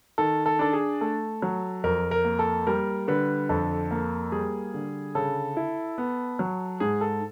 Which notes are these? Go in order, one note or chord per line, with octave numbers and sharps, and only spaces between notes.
D#3 A4
A4
D4 A4
G#4
A3 A4
F#3
F2 A#4
A#4
A#3
A4
G3 A#4
D3 B4
F2 A4
A#3
G3 G#4
D3
C#3 A4
E4
B3
F#3
G#2 G#4
A4